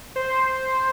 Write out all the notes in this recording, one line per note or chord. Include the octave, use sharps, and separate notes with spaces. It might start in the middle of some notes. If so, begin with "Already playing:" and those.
C5